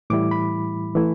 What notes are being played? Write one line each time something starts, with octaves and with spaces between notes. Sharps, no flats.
A2 E3 G3 E4 D6
B5
E3 A3 E4